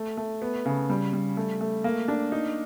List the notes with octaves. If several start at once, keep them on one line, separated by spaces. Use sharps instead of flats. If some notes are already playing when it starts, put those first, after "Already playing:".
Already playing: A3
A3
B3
C#3
G3
G3
A3
A3
A#3
D4
D#4